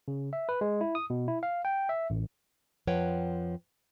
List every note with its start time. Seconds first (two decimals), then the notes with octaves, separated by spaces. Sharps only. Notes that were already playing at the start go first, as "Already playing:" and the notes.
0.08 C#3
0.33 E5
0.49 B4
0.61 G#3
0.81 E4
0.95 D#6
1.10 B2
1.28 E4
1.43 F5
1.65 G5
1.89 E5
2.10 A1
2.87 F2 F3 B4 C#5 F#5 G5